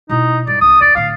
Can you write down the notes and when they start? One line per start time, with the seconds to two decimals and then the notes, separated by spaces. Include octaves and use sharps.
0.09 B2 D#4 E4
0.47 G2 D5
0.61 C2 D#6
0.81 D#2 D5
0.95 A2 D3 F5